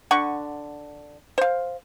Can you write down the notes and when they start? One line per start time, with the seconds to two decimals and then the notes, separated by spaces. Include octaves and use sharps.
0.11 D3 F#5 C#6
1.38 C5 F5